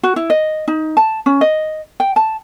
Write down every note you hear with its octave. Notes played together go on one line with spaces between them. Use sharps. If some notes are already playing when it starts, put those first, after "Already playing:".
F#4
E4
D#5
D#4
A5
C#4
D#5
G5
A5